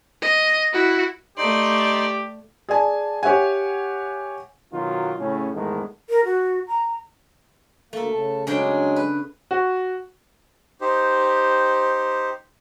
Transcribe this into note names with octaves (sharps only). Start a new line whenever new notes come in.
D#5
E4 F#4
A3 D#4 G4 D5 C6
G#4 D5 G#5 A5
G4 C#5 E5 F#5 G#5
B2 D#3 F#3 F4
A2 C#3 C#4
E2 G#2 D#3 G#3 A3 B3
A#4
F#4
A#5
D2 A3 A#3 A4
C#3 A5
C#3 F#3 G#3 D4 G5 G#5
B4
F#4
D#4 G4 C5